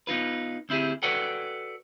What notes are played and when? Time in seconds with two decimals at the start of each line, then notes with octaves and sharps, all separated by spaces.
0.07 B3 D#4 F4 B4
0.69 D2 C4 E4 G4 G#4
1.03 F#4 A4 B4 D5 F#5 G5